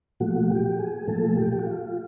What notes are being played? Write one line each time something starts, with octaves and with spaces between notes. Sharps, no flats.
A#2 F3 A3 F#4
G4
G#4
A#2 F3 A3 A4
G4
G4
F#4
F4